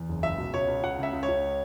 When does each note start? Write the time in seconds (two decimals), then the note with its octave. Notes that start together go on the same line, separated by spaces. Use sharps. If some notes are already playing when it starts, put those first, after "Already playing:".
Already playing: E2
0.09 F#1
0.23 C#2 E5
0.38 B2
0.54 C#2 C#5
0.68 C#2
0.83 C#2 F#5
0.98 C#3 E5
1.13 C#2
1.23 C#5
1.28 C#2